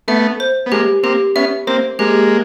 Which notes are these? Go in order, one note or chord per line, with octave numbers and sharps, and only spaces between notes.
A3 B3 E5
C5
B3
G#3 A#3 G4
A#3 C4 G4
B3 C#4 E5
A#3 C4 C5
G#3 A#3 G4